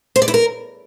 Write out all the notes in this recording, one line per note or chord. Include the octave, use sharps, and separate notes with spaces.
C5
D5
E4
A#4